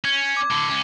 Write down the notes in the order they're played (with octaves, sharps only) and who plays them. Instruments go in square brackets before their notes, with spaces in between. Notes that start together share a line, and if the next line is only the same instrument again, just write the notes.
[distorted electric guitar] C#4 [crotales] G#6
[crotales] D6
[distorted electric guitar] A2 D3
C#2 C#4